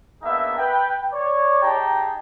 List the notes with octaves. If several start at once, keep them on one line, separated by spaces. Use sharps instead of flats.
A#3 B3 D4 D#4 G#4 E5
B4 G5
C#5 D5
D#4 G4 G#4 G5 A5 A#5